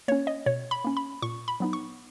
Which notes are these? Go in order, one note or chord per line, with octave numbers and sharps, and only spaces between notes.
A#3 C#4 C#5
D#5
B2 C#5
B5
A#3 C#4
B5
A#2 C#6
B5
F#3 B3 D#4
C#6